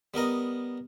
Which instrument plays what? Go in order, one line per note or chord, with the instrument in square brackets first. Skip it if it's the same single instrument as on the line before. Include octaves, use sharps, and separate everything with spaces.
[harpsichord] G3 B3 A#4 D#5